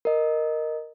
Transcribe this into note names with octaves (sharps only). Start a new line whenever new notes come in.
A#4 D#5